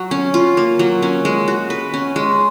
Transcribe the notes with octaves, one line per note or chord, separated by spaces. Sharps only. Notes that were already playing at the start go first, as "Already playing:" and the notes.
Already playing: F#3
C#4
F4
A#3
F#3
C#4
G#3
F#4
B4
C#4
G#3